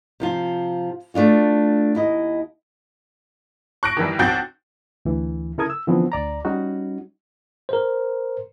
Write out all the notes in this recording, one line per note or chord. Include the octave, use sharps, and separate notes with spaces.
C3 F3 F4
A3 D4 F4 F#4
D#2 E4 D#5
C#6 F#6 A#6 D7
D#3 E3 G3
B1 C4 F#4 G5 G6 A6
D2 E3
C#3 E4 A4 A#4 D#6 G#6
E6
D3 E3 F3 B3 C4
D2 D5 A#5
G3 C#4 D#4 F#4
A#4 C5